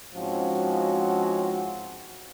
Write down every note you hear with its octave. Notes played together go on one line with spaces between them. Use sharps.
G#2 F3 C4 C#4 F#4